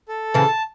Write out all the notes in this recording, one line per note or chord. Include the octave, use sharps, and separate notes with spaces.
A4
C#3 E3 A5